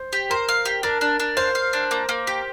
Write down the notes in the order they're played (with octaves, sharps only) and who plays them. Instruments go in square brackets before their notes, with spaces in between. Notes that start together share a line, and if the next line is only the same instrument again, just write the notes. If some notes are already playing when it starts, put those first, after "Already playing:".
Already playing: [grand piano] C5
[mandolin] G4
[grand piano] A#4 [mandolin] C5
[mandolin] F5
G4
[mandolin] D4 [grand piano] A#4
[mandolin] D4
D4
[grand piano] C5 [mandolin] F5
[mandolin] F5
D4
A#3
A#3
G4